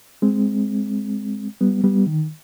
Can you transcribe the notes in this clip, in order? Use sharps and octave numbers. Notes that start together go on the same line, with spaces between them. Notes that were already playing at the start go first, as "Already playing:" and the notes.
G#3 C4
G3 B3
G3 B3
D#3